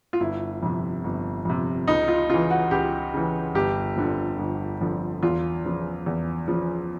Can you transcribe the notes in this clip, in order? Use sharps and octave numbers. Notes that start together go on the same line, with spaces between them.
F4
G1 E4
F2 C3
G1
F2 C3
C#2 D#4
F4
C#3 E3 F4
F#4
C#2 G4
C#3 E3
G1 G4
F2 D3 F3
G1
F2 D3 F3
E2 F4
C#3 F3
E2
C#3 F3